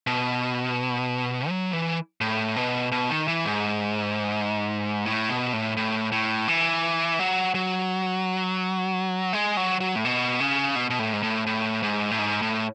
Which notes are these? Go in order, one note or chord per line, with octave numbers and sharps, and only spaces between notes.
B2
F#3
E3
A2
B2
B2
D#3
E3
G#2
A2
B2
A2
A2
A2
E3
F#3
F#3
G#3
F#3
F#3
A2
B2
C#3
B2
B2
A2
G#2
A2
A2
G#2
A2
G#2
A2